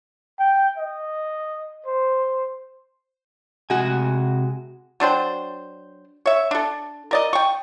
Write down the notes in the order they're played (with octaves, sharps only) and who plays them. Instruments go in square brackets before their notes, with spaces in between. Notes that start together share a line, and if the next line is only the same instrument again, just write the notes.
[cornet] G5
D#5
C5
[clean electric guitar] C3 F#5 G#5 [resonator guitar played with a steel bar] G#3 F#4
[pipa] F#3 D4 C5 G5
C#5 E5
D4 A4
A#4 D5 D#5
G5 C#6